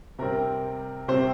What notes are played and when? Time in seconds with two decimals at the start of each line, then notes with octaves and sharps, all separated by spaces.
0.19 C3 G3 C4 A#4
1.08 C3 G3 C4 C5